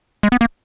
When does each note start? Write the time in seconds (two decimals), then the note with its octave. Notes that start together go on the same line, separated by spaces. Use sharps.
0.23 G#3
0.32 B3
0.41 A#3